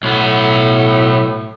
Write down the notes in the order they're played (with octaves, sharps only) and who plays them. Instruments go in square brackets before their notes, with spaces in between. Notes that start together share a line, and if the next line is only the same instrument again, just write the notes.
[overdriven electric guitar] B1 B3 [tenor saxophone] A2